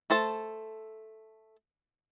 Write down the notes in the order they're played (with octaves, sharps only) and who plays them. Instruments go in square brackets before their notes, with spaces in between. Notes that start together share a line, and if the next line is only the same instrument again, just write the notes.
[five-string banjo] A3 A4 C5 A5